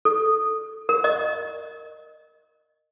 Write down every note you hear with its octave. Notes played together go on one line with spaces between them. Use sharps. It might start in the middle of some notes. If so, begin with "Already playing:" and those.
A4
A#4
D#5